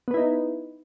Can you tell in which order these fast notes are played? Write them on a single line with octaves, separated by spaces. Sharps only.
B3 B4 E4 D#4